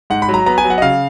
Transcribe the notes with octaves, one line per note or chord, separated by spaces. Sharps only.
G#2 F#5
B5
F#3
A#5
B3 A#5
G#5
F#3
F#5
D#5
C#3 F5